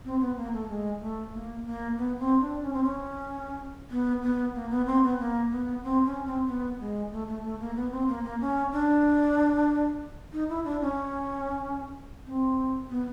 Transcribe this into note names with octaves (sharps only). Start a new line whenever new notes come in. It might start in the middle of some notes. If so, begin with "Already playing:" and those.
C4
B3
A#3
A3
G#3
A3
A#3
A#3
B3
C4
D4
C#4
C4
C#4
B3
B3
A#3
B3
C4
B3
A#3
B3
C4
C#4
C4
B3
G#3
A3
A3
A3
A#3
B3
C4
A#3
A#3
C#4
D4
D#4
E4
D4
C#4
C4
B3